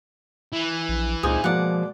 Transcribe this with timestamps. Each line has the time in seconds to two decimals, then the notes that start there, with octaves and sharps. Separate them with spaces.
0.52 E3
0.89 A#1
1.23 C#2 A#2 C4 D#4 G#4 C5
1.44 B2 F3 G#3 A#3 D5 F#5